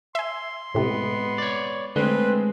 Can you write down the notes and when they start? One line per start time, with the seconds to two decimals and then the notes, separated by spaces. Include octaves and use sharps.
0.15 E5 G#5 C6
0.74 A2 C3 G#3 B3
1.38 C#5 D5
1.96 D3 G#3 A3 C4 B4